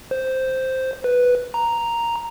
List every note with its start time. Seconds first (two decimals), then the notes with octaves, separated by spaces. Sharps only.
0.11 C5
1.04 B4
1.54 A#5